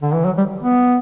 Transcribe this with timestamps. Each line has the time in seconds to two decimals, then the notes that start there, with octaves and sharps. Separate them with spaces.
0.02 D3
0.13 E3
0.25 F#3
0.37 G3
0.63 B3